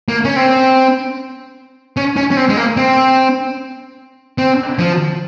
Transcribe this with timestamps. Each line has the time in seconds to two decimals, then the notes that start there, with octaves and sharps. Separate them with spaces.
0.09 A#3
0.25 C#4
0.36 C4
1.97 C#4
2.17 C#4
2.32 C#4
2.37 C4
2.49 G#3
2.57 A#3
2.77 C4
4.38 C4
4.79 F3